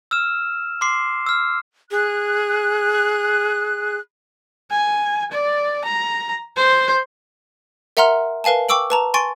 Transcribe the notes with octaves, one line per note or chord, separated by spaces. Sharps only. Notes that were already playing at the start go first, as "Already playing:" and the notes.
E6 F6 E7
C6 D6 C7
E6 F6
G#4 F#6
G#5
D5
A#5
C5
A#4 E5 F#5 A#5 C6 F6
A#4 B4 F5 G#5 A5
G5 C#6 D6 E6 D7 F#7
B4 A5 A#5
G#5 C6 C#6 A6 D7